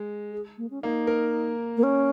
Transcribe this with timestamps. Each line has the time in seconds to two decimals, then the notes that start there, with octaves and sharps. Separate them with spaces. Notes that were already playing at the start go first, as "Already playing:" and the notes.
Already playing: G#3
0.32 G#4
0.58 A#3
0.70 C#4
0.82 A#3 D#4
1.07 A#4
1.77 A#3
1.83 C#4